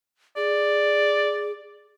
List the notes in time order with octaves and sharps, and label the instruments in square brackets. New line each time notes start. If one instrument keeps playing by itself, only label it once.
[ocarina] G#4 [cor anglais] D5